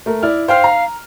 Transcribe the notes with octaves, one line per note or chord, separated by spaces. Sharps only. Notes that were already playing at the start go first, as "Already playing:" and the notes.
A3 A#4
E4 D5 F6
C5 F5 G5 F6
A#5